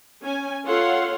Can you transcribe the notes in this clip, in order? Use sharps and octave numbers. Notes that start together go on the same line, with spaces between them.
C#4 G#5
F4 A4 C#5 F5 F#5 C6